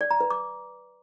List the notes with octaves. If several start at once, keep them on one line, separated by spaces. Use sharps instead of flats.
D5
A#5
B4
D6